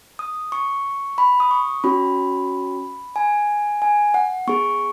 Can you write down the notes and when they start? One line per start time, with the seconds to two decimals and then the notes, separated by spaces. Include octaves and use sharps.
0.19 D#6
0.52 C#6
1.18 B5
1.40 D#6
1.51 C#6
1.84 C#4 F#4 B5
3.16 G#5
3.82 G#5
4.14 F#5
4.47 B3 G#4 C#6